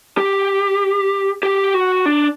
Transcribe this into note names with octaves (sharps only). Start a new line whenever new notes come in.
G4
G4
F#4
D4